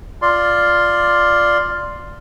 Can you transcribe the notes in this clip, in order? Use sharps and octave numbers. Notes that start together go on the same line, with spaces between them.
F4 D5 C6